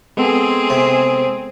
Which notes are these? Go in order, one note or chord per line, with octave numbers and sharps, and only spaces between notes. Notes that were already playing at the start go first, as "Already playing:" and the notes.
G#3 B3 C4 G#4 A4
C3